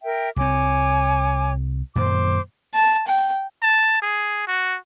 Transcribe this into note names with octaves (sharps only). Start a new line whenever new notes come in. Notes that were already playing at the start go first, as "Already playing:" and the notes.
A#4 E5 G5
C2 C4 C#5 G#5 D6
F#2 A#2 D#3 C5 D6
A5
G5
A5
G#4
F#4